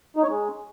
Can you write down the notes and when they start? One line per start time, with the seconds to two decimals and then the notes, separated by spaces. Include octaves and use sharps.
0.16 D#4
0.23 C#5
0.30 G#3